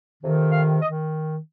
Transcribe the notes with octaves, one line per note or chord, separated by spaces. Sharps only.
F2 C3 D#3
F5
D#3 D#5